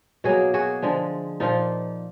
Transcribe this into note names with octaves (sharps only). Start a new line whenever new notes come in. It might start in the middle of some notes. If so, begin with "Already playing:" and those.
B2 F#3 A#3 F#4 G#4
F#4 G#4
D3 F3 G#3
A#2 F3 A#3 D#4 F4